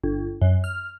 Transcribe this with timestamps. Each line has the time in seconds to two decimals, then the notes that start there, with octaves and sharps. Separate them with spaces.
0.04 G1
0.41 F#2
0.64 F6